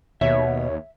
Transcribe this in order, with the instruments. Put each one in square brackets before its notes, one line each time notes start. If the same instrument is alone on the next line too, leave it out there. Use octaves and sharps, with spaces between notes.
[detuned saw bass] D#2 [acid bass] B2 [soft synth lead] C#5 [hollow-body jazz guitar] E5